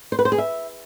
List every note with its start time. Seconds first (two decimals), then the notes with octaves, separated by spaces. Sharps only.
0.12 C5
0.19 B4
0.25 C5
0.32 G#4
0.38 E5